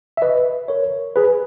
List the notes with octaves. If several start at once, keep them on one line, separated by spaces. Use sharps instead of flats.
E5
B4 D#5
A#4 C#5
G#4 B4